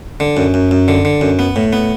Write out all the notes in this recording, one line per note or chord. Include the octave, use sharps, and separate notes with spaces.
D3
F#2
F#2
F#2
D3
D3
F#2
B3
A2
B3